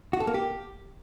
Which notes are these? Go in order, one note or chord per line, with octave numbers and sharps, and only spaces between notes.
F#4
A4
A#3
G4